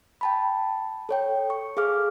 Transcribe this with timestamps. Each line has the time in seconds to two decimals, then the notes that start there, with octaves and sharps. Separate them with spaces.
0.21 G5 A5 B5
1.09 A4 C#5 G5
1.50 C#6
1.77 G#4 A4 F5 D6 F6